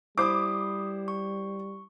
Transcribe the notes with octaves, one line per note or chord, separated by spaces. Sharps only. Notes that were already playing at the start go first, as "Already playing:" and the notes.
G3 E4 C5 B5 D6 D#6
C#6